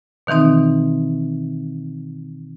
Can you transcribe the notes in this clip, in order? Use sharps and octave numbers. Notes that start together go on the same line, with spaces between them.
B2 D#3 E3 C4 D#4